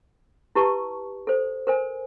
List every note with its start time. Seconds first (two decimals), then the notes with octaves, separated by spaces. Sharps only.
0.55 E4 G4 B4 A5 C#6
1.27 A4 C5
1.67 A#4 C5 G#5